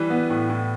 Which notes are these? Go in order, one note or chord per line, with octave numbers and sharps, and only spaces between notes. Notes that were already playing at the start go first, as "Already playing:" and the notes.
Already playing: E3 G3 B4
B3
A2
A2